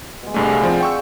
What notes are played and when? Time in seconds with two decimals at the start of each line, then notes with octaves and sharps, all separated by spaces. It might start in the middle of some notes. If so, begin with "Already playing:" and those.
0.23 B2 G#3
0.34 C2 G2 A3 D4 G#4 C#5
0.51 F5 F#5 C6
0.63 F3 C4
0.81 G5 C#6 E6